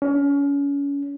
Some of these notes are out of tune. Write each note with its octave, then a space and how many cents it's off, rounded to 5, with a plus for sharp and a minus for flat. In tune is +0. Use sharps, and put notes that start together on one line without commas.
C#4 +30